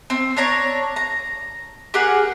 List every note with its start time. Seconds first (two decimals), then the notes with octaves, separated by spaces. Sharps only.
0.10 C4
0.37 D4 C#5 A#5
0.96 A#5
1.94 G4 G#4 A#4 F#5